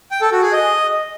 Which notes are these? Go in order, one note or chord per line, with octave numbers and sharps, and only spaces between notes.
G5
A4
F#4
G#4
D#5